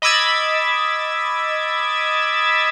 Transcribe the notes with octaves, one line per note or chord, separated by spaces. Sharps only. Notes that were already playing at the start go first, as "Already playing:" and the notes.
D#5 B5 D6 E6 G#6 A6